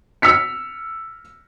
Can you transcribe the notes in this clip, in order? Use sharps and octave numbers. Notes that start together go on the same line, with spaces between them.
E6 F6 B6 C#7